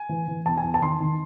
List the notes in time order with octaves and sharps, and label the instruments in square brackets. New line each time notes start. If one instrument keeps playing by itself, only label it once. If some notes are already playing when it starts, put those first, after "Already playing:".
Already playing: [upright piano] G#5
E3
E3
E2 A5
G#5
E2
A5
D#3 C6
D#3